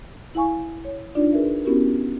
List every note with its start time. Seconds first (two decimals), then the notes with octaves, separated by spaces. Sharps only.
0.35 E4 F5 G#5 C#6
0.85 C#5
1.15 D4 D#4 F4 D5
1.32 G#4 A#4 B4 E5
1.64 B3 C#4 E4 F#4 G4 A#4